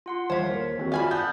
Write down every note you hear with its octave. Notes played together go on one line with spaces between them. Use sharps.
F4 F#5 C6
D#1 C5 C#5 F5 C#6 B6
A#3
D#3 C4 F#4
F4 F#4 D5 F5 G#5 A5 B5 F6
B3 G6